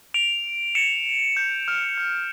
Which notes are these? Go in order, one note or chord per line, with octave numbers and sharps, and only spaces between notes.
D7 F7
C#7 E7
G6
F6
G6